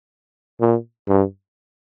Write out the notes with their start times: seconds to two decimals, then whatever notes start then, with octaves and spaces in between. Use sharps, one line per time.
0.61 A#2
1.08 G2